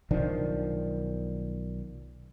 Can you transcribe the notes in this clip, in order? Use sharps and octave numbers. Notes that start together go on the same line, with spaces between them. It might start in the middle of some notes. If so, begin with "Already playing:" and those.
B1 D#3 F3 D4